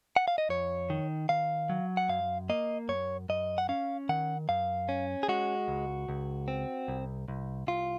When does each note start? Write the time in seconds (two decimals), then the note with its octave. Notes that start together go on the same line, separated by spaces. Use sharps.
0.16 F#5
0.28 F5
0.38 D#5
0.49 F2 C#5
0.90 D#3
1.29 D#3 F5
1.70 F#3
1.97 F#5
2.09 F#2 F5
2.49 A#3 D#5
2.89 F#2 C#5
3.29 F#2 D#5
3.58 F#5
3.69 C#4 F5
4.09 D#3 F#5
4.49 F#2 F5
4.89 C#4
5.23 G#4
5.28 G#3 F#4
5.68 C#2
6.09 C#2
6.48 C4
6.88 C2
7.28 C2
7.67 C2 F4